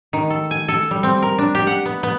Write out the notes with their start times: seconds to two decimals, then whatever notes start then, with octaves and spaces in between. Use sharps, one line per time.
0.13 D#3
0.30 A4
0.51 G#5
0.68 A4
0.91 G3
1.03 C4
1.22 A#4
1.38 D4
1.55 G4
1.67 F#5
1.86 B3
2.03 B3